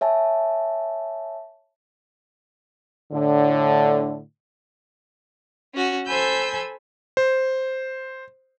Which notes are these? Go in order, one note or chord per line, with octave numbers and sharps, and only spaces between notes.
C#5 E5 G#5 A5
A2 D3
C#4 F#4
A4 C5 G#5 B5 E6 G6
C5